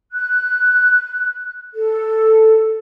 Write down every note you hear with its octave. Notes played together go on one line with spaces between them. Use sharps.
F#6
A4